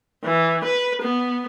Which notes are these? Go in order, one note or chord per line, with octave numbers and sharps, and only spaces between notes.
E3
B4
B3